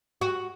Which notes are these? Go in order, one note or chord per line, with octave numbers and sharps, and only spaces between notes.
F#4